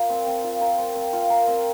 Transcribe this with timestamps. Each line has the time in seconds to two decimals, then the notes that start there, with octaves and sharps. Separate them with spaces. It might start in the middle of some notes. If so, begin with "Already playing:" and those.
Already playing: F4 A#4
0.10 C4
0.26 C4
0.44 F4
0.61 A#4
0.78 C4
0.95 C4
1.13 F4
1.30 A#4
1.47 C4